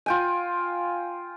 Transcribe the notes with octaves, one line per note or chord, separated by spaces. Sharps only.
F4 G5 G#5